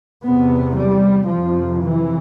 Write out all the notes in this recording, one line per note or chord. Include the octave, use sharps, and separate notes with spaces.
E2 C3 B3
G3
F2 C3 F3
E3